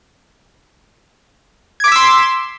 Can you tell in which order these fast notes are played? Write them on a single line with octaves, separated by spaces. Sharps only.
G#6 D6 B6 E6 C6